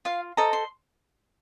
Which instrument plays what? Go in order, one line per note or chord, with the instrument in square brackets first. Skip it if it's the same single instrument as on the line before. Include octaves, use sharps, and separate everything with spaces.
[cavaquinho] F4 F5
A4 C5 D#5 A#5
C6